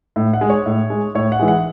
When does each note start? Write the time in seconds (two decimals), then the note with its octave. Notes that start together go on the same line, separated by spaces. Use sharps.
0.16 A2
0.33 F#5
0.41 G#3
0.50 C#5
0.66 A2
0.90 G#3
1.15 A2 C#5
1.32 F#5
1.40 E3 G#3
1.48 F#5